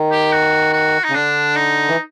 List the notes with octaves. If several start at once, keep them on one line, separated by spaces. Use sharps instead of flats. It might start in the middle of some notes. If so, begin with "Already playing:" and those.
Already playing: D#3
G4
F#4
F#4
D#4
C#3
D3 D4
D#4
E3